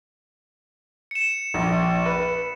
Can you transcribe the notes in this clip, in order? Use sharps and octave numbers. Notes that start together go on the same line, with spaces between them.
C#7 E7
A#1
B4